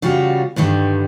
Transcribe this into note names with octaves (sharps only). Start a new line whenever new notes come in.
C#3 G3 F4 F#4
G2 D3 D#3 G3